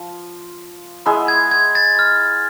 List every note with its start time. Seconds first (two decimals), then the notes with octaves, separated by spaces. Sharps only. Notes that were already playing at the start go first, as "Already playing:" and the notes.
Already playing: F3
1.06 G#3 B3 E4 G#4
1.28 G#6
1.51 G#6
1.75 A6
1.99 F6